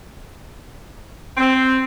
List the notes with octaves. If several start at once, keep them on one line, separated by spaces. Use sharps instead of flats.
C4